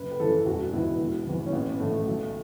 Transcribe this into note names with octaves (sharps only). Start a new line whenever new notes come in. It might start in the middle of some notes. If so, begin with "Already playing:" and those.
Already playing: F#1 B4
B4
F#2 E3 A4
E1 F#4
E2 B2 E4
E1
E2 E3
C#4
A1 B3
A2 E3 A3
B1